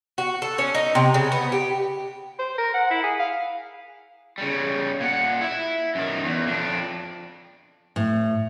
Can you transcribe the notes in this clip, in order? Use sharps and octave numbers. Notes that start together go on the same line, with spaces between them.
F#4
A4
C#4
D#4
C3
C#3
B3
G4
C5
A#4
F#5
E4
G#4
F5
C#3 G3
A#2 F#5
E4 E5
F#2 D#3
E2
F2 D4
A2